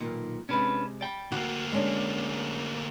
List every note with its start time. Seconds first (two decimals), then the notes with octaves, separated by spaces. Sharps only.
0.01 B1 A#2 D#3
0.49 C3 G#3 C#4 D4 B4
1.01 D5 G5
1.32 D2 A#3 F#4
1.72 G#3 C#4 D4